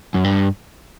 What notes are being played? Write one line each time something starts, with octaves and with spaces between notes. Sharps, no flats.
F#2
G2